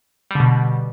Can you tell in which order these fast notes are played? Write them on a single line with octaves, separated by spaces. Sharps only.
G3 D3 B2